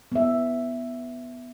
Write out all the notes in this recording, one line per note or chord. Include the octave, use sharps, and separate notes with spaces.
B3 E5